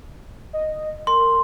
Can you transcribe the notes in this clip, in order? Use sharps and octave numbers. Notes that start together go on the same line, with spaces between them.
D#5
A#4 C6